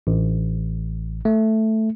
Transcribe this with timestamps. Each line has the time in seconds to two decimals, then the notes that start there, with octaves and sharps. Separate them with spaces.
0.07 A1
1.25 A3